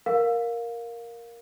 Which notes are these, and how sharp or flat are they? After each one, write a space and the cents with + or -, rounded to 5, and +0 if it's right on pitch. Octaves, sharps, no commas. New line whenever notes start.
A#4 +0 F5 +15